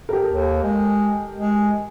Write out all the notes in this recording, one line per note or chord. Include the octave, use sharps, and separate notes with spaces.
G4 A4 A#4
D#2
G#3
G#3